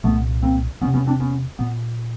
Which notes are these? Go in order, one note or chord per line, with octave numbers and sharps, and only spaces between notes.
C2 A#2 A3 B3
A#3 C4
E2 C3 B3 C#4
B3 C#4
C4 D4
B3 C#4
A#2 B3